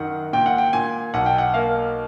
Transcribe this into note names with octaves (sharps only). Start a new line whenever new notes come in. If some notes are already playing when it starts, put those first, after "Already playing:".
Already playing: F#2 D#3 F#5
A#2 G5
F#5
G5
A#2 G#5
B1 F#5
G5
F#5
A#3 F5